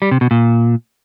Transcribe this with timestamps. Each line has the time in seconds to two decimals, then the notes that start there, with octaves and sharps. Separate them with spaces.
0.02 G3
0.11 C3
0.21 B2
0.31 A#2